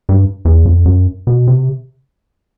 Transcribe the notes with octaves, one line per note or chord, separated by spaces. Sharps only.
G2
E2
F2
F#2
B2
C3